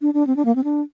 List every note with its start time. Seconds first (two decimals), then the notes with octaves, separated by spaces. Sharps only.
0.02 D4
0.14 D4
0.27 C4
0.36 D4
0.45 A#3
0.56 C4
0.64 D4